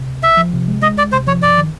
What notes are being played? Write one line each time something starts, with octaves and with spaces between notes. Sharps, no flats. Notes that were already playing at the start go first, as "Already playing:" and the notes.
Already playing: C3
C#2
C#2 E5
F3
C3
G#3
G#3 D#5
C#2 D5
C3 C5
F3 C#5
G2 D5
D#3